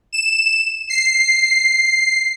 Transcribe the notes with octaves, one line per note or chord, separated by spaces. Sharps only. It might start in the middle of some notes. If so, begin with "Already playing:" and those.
E7
C7